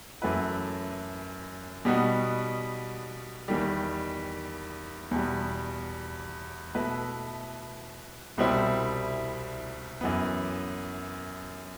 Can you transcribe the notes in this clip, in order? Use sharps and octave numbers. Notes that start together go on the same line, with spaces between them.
F#2 E3 A3 E4 B4
B2 G3 B3 D#4 F#4
E2 D#3 G3
E2 B2 G3
B2 A3 E4 B4
C2 B2 G3 C4 E4
F#2 E3 B3